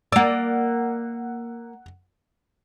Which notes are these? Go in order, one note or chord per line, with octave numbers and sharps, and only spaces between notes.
A#3 D5 F#5 E6